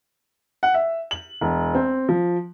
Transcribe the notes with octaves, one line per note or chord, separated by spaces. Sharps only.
F#5
E5
F#7
E1
C4
F3